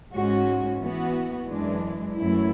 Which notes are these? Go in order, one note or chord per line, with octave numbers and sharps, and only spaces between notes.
G#2 G#3 C#4 F#4
E3 B3 F#4
F#2 E3 G#3 D4
F#2 E3 A3 E4